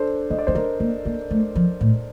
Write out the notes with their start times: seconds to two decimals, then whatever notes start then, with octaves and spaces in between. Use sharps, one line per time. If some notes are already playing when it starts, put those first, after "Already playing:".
Already playing: D4 A4 C5
0.30 D4 D#5
0.38 D5
0.47 C4 C5
0.55 D4 A#4 D5
0.80 A#3
1.05 A#3
1.31 A3
1.55 F3
1.81 A2